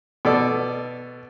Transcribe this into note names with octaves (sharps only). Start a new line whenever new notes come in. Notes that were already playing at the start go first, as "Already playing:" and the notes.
B2 A4 D5